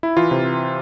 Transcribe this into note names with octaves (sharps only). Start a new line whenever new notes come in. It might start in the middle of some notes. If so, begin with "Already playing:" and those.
E4
E3 F4
C3